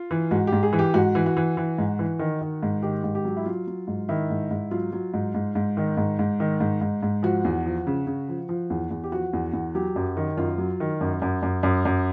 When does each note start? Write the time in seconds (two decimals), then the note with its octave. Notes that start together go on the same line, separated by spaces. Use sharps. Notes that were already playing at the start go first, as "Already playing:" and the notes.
Already playing: F4
0.11 E3
0.31 G#2 F#4
0.47 G4
0.53 G#2
0.63 G#4
0.73 E3
0.79 G4
0.94 G#2 F#4
1.15 E3
1.26 F#4
1.37 E3
1.57 E3
1.78 G#2
1.99 E3
2.19 D#3
2.41 D#3
2.63 G#2
2.82 D#3 G4
3.04 G#2
3.15 G4
3.25 F#3
3.37 E4
3.46 F#3 F4
3.67 F#3
3.87 G#2
4.09 D#3 E4
4.30 G#2
4.51 G#2
4.71 F#3 F4
4.93 F#3
5.14 G#2
5.35 G#2
5.55 G#2
5.77 D#3
5.97 G#2
6.19 G#2
6.40 D#3
6.60 G#2
6.81 G#2
7.03 G#2
7.23 F3 F#4
7.45 E2
7.66 F3
7.87 C#3
8.07 C#3
8.29 F3
8.49 F3
8.70 E2
8.90 E2
9.04 G4
9.12 F3 F#4
9.33 E2
9.53 E2
9.75 F#3 G4
9.96 F#2
10.17 D#3
10.37 F#2 F4
10.58 F#3
10.80 D#3
11.01 F#2
11.22 F#2
11.43 F#2
11.63 F#2
11.85 F#2